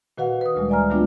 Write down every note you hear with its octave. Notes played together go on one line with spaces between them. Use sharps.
A#2 D#3 F#4 B4 F5 F#5
B4 D#6
D2 A#2 G3 G#3
D5 E5 G#5 A#5 F6
D#3 G3 A3 B3 D4 F4